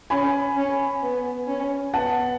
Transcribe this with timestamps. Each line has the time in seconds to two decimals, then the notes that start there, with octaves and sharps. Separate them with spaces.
0.10 C#4 G#5 B5
0.56 C#4
1.02 B3
1.47 C#4
1.94 B3 F#5 A5